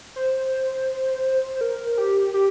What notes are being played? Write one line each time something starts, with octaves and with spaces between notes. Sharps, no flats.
C5
A#4
G4
G4